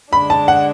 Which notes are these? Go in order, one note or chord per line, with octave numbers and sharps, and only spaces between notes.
D3 G#3 D4 B5
A5
F#5